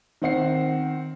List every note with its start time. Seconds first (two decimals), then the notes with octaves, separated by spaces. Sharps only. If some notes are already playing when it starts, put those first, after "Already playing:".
0.22 D#3 C4 F#5 C7